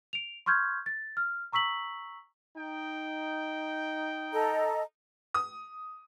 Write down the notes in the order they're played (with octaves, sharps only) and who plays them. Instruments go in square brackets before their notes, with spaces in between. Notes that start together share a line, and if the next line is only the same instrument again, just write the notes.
[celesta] D7 F7
C6 C#6 F6 G6 G#6
A6
F6
A#5 C#6 E6 B6 F#7
[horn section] D#4 G5
[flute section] A4 D#5 A#5
[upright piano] D#6